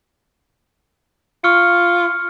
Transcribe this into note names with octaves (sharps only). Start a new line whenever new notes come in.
F4 C#6 F6 C#7